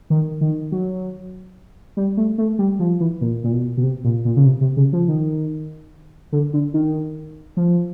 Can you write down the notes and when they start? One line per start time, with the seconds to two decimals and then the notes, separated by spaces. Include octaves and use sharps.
0.10 D#3
0.41 D#3
0.72 F#3
1.97 G3
2.17 A3
2.38 A3
2.59 G3
2.79 F3
3.00 E3
3.21 A#2
3.44 A#2
3.52 B2
3.77 B2
3.83 C3
4.04 A#2
4.25 A#2
4.37 C#3
4.46 C3
4.61 C3
4.77 C#3
4.93 F3
5.08 D#3
6.32 D3
6.53 D3
6.74 D#3
7.57 F3